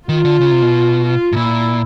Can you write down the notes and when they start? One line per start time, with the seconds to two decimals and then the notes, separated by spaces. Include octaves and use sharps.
0.09 D#3 F4
0.25 D3
0.41 C#3
0.51 C3
0.62 B2
1.04 F4
1.32 A2
1.36 A#2 E4